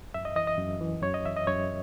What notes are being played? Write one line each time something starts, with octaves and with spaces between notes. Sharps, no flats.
F#2 E5
D#5
E3 D#5
D#5
F#2
E3
F#2 C#5
D#5
E3 E5
D#5
F#2 C#5